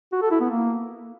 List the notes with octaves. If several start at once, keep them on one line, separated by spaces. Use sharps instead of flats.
F#4
A4
E4
B3
A#3